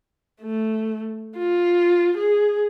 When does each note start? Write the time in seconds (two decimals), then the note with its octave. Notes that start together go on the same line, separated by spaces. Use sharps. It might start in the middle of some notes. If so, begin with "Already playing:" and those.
0.42 A3
1.38 F4
2.17 G#4